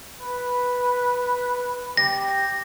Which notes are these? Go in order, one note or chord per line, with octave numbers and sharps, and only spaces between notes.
B4
G4 A#6